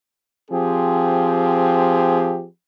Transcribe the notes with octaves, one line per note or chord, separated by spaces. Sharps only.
F3 C4 G4 G#4